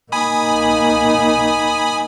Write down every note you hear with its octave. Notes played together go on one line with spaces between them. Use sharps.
A#3 D#4 G#5 B5 D#6